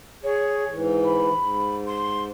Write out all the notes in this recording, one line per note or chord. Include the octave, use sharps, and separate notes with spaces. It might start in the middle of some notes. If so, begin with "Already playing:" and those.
G#4 C#5
G#2 E3
B5
G#2
C6